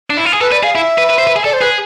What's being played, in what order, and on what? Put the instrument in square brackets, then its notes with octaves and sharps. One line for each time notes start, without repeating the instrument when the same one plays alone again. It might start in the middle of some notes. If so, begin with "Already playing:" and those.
[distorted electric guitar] D4
E4
F4
G#4
[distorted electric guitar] A4 [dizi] B4
[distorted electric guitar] B4 [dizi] D5
[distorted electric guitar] G#4 [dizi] F5
[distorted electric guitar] E4 [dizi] E5
[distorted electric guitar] B4
B4
C5
B4
G#4
[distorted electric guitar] A4 [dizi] D5
[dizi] C5
[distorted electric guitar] G#4 [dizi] B4